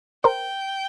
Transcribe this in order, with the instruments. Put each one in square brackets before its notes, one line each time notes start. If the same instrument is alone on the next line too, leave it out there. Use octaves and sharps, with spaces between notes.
[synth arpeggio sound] A#4 C5 [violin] G5